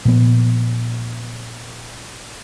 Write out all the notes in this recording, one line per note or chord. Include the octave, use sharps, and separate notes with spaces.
A#2 F3 B3